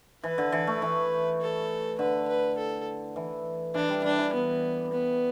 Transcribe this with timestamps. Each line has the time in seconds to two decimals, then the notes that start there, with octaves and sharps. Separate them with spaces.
0.23 E3 B4
0.38 D3
0.52 E3
0.67 A3
0.82 E3
1.41 A4
1.99 D3 B4
2.28 B4
2.58 A4
3.16 E3
3.74 E3 D4
3.89 G3
4.03 G3 D4
4.19 E3
4.33 B3
4.92 B3